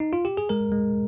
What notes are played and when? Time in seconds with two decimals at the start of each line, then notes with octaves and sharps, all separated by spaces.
0.00 D#4
0.13 F4
0.25 G4
0.37 G#4
0.49 G#3 A#4
0.72 G#3